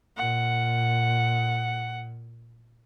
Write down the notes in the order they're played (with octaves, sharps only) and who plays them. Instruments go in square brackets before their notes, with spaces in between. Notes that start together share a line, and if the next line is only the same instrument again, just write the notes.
[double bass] A#2 [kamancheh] F#5